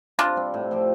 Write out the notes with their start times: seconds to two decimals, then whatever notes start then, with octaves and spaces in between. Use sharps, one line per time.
0.18 C3 D4 F4
0.36 G3 C4
0.54 A2
0.71 F3 C4 G4